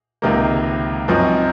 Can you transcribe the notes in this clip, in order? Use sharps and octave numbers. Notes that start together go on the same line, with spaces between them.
C#2 C3 D#3 A#3
F#2 F3 C4 D#4